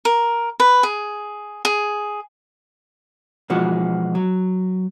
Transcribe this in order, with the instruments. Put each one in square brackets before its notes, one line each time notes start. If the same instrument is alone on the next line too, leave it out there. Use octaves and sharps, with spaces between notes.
[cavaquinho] A#4
B4
G#4
G#4
[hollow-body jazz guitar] B2 E3 F3 G#3 F#4
F#3